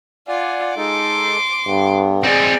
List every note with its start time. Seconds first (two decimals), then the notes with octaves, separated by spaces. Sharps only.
0.28 F4 D5 F#5 G#5
0.77 G#3 D#4 A4 C6 D6
1.67 G2 D3 B3
2.24 C4 D#4 G#4 D5